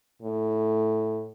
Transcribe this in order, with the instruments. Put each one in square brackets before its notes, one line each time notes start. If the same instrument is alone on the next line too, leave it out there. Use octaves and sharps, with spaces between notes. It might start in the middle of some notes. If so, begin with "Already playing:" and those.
[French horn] A2